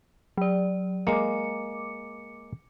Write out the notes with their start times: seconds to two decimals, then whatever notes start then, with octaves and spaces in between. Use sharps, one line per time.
0.37 F#3 D5
1.07 G#3 A#3 D6 C#7